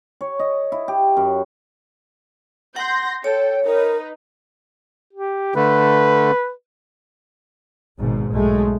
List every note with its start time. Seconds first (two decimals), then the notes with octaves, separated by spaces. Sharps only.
0.21 C#5
0.39 D#5
0.72 E4
0.88 G4
1.17 F#2
2.76 F#5 C6 G6 A#6
3.24 A4 C#5 G5
3.65 D#4 A#4 B4
5.13 G4
5.55 D3 A3 B4
7.99 G#1 G#2 B2
8.31 B1 G#3 A3